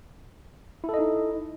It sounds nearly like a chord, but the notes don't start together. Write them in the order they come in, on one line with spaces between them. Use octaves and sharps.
E4 A4 D#5 D#4